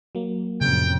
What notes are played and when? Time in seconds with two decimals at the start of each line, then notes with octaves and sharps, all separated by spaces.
0.15 F#3 A#3
0.61 F2 A2 C3 C#4 G5